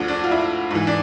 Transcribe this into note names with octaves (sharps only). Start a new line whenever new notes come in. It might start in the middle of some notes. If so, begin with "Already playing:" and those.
Already playing: D2 D3 F3
D4
F4
E4
G#2 E3
D4